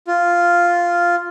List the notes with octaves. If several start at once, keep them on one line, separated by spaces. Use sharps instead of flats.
F4